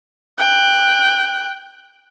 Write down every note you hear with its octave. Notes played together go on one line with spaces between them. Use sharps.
G5 F#6